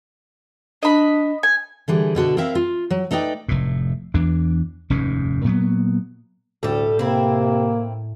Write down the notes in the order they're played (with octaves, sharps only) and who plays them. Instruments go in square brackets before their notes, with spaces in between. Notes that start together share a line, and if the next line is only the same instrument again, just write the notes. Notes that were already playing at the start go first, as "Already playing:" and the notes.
[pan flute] D4 [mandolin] D#5 B5
[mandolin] G#5
[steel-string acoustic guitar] D3 E3 G3 G#4
B2 D3 F#4 A4
C4 E4 A#4 E5 F5
F4
F#3
A3 D#4 B4 D5 G5
[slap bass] F1 A2
E2 E3 D4
F1 D#2 G#2 C#4
A#2 F#3 B3
[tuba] D2 [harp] A2 [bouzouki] G3 A4
[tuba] C3 [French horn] A#3 [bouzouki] C4 E4